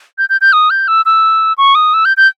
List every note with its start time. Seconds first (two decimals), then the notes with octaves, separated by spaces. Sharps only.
0.18 G6
0.29 G6
0.41 G6
0.53 D#6
0.70 G6
0.88 E6
1.06 E6
1.58 C#6
1.75 D#6
1.94 E6
2.05 G6
2.17 G6